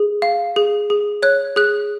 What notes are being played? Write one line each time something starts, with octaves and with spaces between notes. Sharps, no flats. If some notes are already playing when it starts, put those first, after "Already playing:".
Already playing: G#4
F5
G#4
G#4
C#5 F#6
G#4 F#6